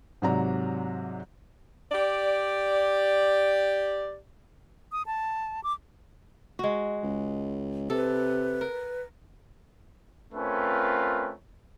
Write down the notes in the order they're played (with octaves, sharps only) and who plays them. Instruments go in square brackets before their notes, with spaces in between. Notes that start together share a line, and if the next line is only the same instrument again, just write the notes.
[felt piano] G#2 C3 F#3 D5 A#5
[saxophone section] G4 D5
[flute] D#6
A5
D6
[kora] G#3 F#4
[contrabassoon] C#2
[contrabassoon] C3 [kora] A4 [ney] B4
[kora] A#4
[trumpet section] A3 C4 C#4 F4 A#4 B4